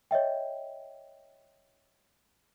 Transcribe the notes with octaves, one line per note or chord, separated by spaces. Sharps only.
C#5 D#5 E5 G5